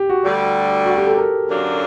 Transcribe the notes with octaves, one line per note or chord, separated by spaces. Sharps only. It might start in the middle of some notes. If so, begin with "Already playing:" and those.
Already playing: G4
F#4
D2 D3 G3
F#4
G4
A4
A#4
F#2 D3 F#3 A#3 D4